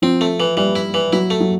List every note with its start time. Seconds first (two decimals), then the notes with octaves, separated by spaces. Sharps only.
0.02 F3 C4
0.21 A3
0.40 E3
0.57 E3 G3
0.76 E4
0.94 E3
1.13 F#3 E4
1.30 A3
1.40 F#3